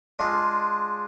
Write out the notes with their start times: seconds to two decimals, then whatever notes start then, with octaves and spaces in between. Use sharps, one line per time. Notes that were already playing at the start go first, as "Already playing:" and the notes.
0.19 G#3 D4 F4